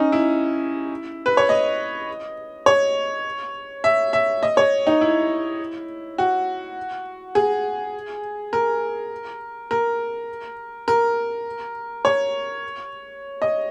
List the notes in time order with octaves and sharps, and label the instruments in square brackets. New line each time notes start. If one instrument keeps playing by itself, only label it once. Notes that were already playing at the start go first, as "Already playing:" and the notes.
Already playing: [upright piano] C#4 D#4
E4
B4
C#5
D#5
C#5
E5
E5
D#5
C#5
D#4
E4
F#4
G#4
A#4
A#4
A#4
C#5
D#5